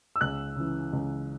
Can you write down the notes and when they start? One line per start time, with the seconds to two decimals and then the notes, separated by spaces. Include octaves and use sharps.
0.16 E6
0.21 C#2 F#6
0.56 C#3 E3
0.93 C#2